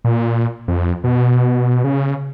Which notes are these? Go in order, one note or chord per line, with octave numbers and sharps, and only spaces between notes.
A#2
F2
B2
C#3